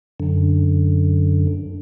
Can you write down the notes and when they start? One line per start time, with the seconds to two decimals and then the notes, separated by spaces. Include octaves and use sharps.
0.20 F#2 D3